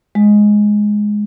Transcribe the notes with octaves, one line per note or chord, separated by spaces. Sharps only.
G#3